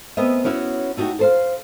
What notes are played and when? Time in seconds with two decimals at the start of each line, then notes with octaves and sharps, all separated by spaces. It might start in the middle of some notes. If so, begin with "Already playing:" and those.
0.17 A3 B3 C4 A#4 D#5 E5
0.44 B3 C#4 E4 F#4 C#5
0.97 A3 D#4 F#4 G4
1.19 A4 C5 F5